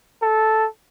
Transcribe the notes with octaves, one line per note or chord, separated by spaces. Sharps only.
A4